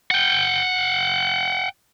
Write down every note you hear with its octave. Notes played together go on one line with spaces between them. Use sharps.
F#5 G5